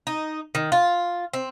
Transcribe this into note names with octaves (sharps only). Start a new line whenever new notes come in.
D#4
D#3
F4
C4